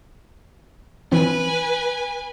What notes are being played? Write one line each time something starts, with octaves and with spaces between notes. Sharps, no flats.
E3 C4 B4 G#5